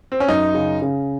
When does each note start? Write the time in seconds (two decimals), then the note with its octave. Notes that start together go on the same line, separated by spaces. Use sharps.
0.12 C4
0.20 C#4
0.28 F#2 D#4
0.54 C#3
0.82 C#3